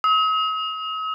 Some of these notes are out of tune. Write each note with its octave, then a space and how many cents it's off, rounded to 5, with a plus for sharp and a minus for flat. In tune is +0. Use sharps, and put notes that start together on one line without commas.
D#6 +45